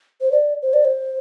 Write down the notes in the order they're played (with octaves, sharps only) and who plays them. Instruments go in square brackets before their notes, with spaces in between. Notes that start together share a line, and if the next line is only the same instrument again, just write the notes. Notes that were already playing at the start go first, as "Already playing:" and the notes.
[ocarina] C5
D5
C5
D5
C5